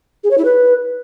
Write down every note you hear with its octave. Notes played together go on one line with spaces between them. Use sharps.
G#4
C#5
E4
B4